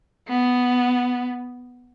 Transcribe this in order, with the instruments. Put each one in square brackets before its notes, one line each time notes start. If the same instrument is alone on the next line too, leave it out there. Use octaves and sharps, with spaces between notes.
[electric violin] B3